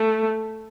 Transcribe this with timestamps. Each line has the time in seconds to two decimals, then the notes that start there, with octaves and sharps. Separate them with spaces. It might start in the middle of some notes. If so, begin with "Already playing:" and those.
Already playing: A3